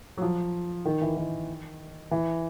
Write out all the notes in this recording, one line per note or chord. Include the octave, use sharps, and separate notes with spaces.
F#3
F3
D#3
E3
D#3
E3